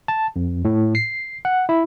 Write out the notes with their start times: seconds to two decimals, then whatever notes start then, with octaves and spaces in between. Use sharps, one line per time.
0.08 A5
0.36 F2
0.65 A2
0.95 C7
1.45 F#5
1.69 E4